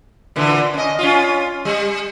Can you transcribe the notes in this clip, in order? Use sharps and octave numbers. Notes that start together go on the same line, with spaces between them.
A#2 D3 E3
C#4 D#5
C#4 F4
G3